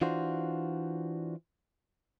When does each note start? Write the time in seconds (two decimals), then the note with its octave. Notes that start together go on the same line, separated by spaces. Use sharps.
0.01 E3 D4 F4 F#4 C5